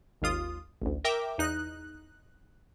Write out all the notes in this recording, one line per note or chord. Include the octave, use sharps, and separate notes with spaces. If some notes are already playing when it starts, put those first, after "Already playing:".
G#1 D#2 F4 D#6
A1 D2
A#4 E5 G5 D6
E2 D#4 F#6